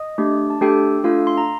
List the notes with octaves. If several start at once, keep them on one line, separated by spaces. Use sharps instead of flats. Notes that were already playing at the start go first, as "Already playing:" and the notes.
Already playing: D#5 D#6
A3 D4 G4
A5
A3 D4 G4 A4 G5
A3 D4 F4 A4 F5
C6
A#5